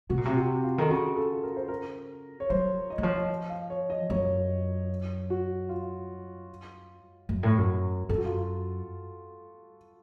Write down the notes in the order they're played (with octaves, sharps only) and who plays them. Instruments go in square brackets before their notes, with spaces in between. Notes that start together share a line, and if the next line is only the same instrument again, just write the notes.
[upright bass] C3 [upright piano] F#4
[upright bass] A#2
C3
[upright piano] F#4
F4
[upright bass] D#3 [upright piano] A4
[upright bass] C#3 [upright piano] F#4
[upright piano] A4
A#4
C5
A#4
C#5
[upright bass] F#3 [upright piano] C5
[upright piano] D#5
[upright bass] D#3
[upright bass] F3 [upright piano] C#5
[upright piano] D#5
D#5
F5
C#5
D#5
[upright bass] F#2 [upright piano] C#5
[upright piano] F#4
F4
[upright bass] F#2
A2
F#2
[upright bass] F#2 [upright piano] A4
[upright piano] F#4
F4
F#4